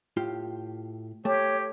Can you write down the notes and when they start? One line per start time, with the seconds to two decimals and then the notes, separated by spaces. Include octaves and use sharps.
0.17 A2 F4 G4
1.25 A3 G4 C#5